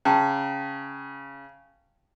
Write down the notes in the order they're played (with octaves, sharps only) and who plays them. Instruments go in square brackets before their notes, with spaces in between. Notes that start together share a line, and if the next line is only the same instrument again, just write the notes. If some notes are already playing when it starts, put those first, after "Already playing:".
[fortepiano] C#3 [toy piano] G5 A5 A#5